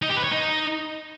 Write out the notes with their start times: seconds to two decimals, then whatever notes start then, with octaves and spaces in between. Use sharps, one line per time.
0.02 D#4
0.09 G4
0.17 B4
0.24 C#5
0.31 D#4